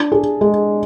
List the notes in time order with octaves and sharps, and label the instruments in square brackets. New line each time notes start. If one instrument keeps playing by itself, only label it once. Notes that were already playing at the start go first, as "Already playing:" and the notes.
Already playing: [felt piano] D4
G#4
G#3